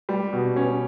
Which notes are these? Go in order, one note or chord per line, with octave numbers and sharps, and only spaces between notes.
G3
B2
C#4